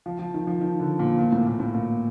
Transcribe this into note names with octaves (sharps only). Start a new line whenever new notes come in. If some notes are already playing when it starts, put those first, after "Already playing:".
F3
F3
D#3
F3
D#3
D3
A#2
A#2
A2
A#2
A2
A#2